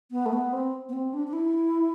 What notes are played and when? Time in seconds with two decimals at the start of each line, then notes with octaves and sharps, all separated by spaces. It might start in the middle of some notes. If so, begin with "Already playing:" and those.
0.11 B3
0.26 A3
0.33 B3
0.53 C4
0.89 B3
0.93 C4
1.14 D4
1.27 D4
1.33 E4